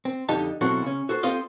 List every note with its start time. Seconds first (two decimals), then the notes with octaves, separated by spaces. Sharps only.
0.05 C4
0.29 F2 D3 D#4 G4 A5
0.61 B2 F#3 C4 E4 F#4 A4
0.82 C#3 C#4
1.09 F#4 A4 C5
1.23 C4 F4 A4 C5 D#5 F5